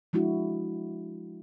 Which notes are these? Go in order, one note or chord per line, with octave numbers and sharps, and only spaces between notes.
F3 G#3 D4 E4 F#4